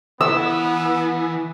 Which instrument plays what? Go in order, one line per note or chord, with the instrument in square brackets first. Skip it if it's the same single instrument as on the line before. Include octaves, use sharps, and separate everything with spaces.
[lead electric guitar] E3 [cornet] B3 [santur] E6